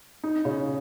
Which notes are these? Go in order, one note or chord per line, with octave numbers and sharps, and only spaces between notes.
D#4
C#3